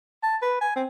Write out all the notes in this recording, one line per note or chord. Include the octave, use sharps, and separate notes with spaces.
A5
B4
G#5
C4